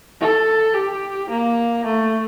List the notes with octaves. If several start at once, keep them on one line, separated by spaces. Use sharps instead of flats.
A4
G4
A#3
A3